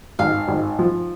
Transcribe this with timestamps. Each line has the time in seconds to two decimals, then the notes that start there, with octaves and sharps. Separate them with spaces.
0.19 G#1 F5
0.48 G#1
0.79 F3